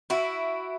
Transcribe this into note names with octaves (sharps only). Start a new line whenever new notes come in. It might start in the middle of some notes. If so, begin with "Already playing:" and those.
E4 F#4